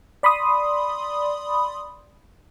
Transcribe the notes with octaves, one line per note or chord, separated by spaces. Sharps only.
D5 B5 C6 D#6